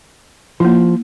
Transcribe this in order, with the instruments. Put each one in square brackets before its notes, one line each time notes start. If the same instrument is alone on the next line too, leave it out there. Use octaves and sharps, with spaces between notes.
[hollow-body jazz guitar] F3 [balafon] A#3 E4